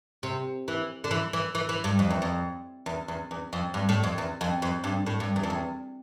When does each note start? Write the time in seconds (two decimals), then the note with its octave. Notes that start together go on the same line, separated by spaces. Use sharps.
0.23 C3
0.68 E3
1.04 D3
1.11 E3
1.33 E3
1.55 E3
1.69 E3
1.84 G2
1.99 F2
2.10 E2
2.22 F2
2.86 E2
3.08 E2
3.31 E2
3.53 F2
3.74 G2
3.89 A2
4.04 F2
4.18 E2
4.41 F2
4.62 F2
4.84 G2
5.06 A2
5.20 G2
5.36 E2
5.43 F2
5.50 E2